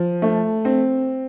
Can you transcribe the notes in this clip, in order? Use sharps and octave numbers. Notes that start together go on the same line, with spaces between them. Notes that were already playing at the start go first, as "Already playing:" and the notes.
Already playing: F3
A3
C4